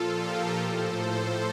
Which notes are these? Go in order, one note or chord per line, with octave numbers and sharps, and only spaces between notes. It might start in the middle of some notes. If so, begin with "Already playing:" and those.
Already playing: A#2 F3 F4 A4
G4 A#4
A2 F3 A4 C5